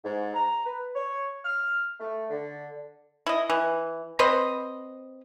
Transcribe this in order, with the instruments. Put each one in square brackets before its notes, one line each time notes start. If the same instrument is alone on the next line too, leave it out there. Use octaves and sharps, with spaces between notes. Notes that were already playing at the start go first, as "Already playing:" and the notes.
[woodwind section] G#2
A#5
B4
C#5
F6
A3
D3
[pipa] E4 D#5
E3
C4 B4 C5 D#5